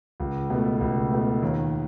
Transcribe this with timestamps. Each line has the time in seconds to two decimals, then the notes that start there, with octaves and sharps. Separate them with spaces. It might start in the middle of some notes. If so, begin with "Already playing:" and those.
0.20 C#2
0.50 B2 A3
0.81 C#2
1.11 B2 A3
1.42 D#2